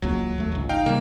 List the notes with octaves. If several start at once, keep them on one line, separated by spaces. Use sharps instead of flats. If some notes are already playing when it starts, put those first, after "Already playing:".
D#1 C#2 F#3 A#3
D#2 A3
G#1 C#2
D#4 F5 G5
C3 G3 A#3